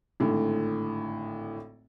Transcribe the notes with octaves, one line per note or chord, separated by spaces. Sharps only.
G#1 A2 D3